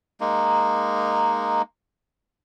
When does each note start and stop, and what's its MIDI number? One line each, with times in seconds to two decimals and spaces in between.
0.21 1.62 56
0.21 1.62 58
0.21 1.62 63